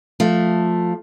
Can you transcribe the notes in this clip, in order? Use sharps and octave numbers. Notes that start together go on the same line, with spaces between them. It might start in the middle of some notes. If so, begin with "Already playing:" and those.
F3 A3